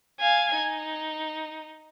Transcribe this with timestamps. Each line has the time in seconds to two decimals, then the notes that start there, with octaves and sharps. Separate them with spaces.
0.20 F5 G#5
0.57 D#4